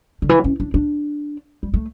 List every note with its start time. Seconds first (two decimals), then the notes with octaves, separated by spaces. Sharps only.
0.22 D3
0.29 E3
0.44 C#4
0.60 D4
0.74 D4
1.63 G3
1.74 A3